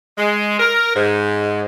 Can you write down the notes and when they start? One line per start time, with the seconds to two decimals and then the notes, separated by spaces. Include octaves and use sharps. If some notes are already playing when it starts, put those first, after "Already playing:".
0.18 G#3
0.59 A#4
0.95 G#2